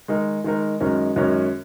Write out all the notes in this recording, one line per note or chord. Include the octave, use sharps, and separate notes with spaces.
D#3 G#3 D#4 A#4
D#3 G#3 D#4 A#4
F#2 D#3 G#3 C#4 A#4
F#2 D#3 G#3 C#4 A#4